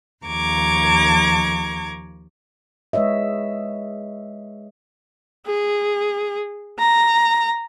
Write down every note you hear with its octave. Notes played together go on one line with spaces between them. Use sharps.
D#2 F3 A#5 C#6 D6 G#6
G#3 B4 C#5 D#5 E5
G#4
A#5